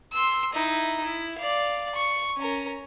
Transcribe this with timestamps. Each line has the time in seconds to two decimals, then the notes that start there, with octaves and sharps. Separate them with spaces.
0.13 C6 E6
0.53 D#4 E4
1.03 E4
1.38 D5 F5
1.95 C#6
2.38 C#4 A#4